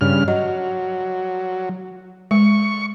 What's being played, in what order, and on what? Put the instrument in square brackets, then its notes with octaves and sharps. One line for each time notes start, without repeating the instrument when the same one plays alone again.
[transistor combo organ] G2 C#3 F6
[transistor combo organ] F#3 [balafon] D#5
[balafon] G#3 [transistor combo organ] C#6